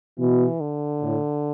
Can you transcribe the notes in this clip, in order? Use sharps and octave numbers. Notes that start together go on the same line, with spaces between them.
B2 E3
D3
A2